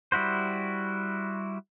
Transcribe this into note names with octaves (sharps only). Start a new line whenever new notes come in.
G3 E4 F#4 C5